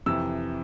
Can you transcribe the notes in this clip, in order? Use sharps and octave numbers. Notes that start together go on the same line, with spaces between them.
F2 C3 E3 E6